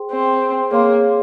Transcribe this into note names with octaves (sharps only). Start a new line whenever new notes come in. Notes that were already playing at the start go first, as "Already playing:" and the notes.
Already playing: G#4 C5 G5 C6
C4
A#3 G#4 C#5 F5 C6